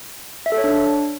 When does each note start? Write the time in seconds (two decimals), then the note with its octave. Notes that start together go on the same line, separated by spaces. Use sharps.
0.46 E5
0.52 A4
0.58 C#5
0.64 D4